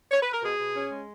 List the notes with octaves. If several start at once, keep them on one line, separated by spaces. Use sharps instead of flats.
C#5
B4
A#4
B2 G#4
B2
C#4
G#3